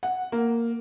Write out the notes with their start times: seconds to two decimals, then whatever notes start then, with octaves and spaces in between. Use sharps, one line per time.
0.03 F#5
0.32 A#3